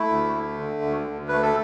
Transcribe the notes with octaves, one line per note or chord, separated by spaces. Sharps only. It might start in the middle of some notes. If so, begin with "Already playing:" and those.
Already playing: A3 E4
D2
A3
D3
D2
D2
A3 B4
A4